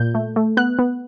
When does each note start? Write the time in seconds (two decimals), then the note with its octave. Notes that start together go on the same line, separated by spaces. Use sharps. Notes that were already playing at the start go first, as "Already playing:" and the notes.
Already playing: A#2 G6
0.15 A3
0.36 A3
0.57 B3 F#6
0.79 B3